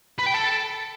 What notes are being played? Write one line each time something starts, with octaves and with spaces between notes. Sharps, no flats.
B4
G5
A4